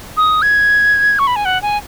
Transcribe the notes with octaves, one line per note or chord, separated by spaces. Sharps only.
D#6
G#6
C#6
B5
G#5
F#5
G#5